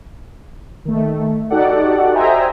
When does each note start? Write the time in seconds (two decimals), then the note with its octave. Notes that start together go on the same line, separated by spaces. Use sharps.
0.85 D#3 A3
1.50 D#4 F#4 G4 A4 D5 F#5
2.14 C5 D#5 E5 G5 G#5 A#5